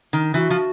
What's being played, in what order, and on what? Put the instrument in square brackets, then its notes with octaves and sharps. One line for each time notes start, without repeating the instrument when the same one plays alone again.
[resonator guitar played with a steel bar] D#3
[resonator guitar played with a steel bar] E3 [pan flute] F#4
[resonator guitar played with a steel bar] F3